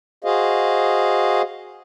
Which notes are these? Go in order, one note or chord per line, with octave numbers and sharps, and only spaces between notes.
F#4 G#4 C5 D#5 F5